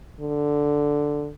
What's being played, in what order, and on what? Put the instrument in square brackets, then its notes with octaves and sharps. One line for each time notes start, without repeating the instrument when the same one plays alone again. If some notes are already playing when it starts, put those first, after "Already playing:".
[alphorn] D3